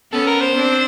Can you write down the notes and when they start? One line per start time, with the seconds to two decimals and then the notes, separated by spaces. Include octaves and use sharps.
0.12 B3 C#4 A4
0.27 A#4
0.41 C5
0.56 C4 D4